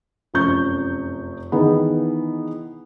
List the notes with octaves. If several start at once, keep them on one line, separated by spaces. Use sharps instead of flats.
F1 F#2 F3 C#6 G6
D#3 E3 B3 G#4